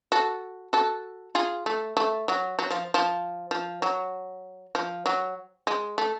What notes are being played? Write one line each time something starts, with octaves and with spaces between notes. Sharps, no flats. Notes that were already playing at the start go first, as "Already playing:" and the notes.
F#4 A4
F#4 A4
F4 G#4
A3
A3
F#3
F#3
F3
F3
F3
F#3
F3
F#3
G#3
A3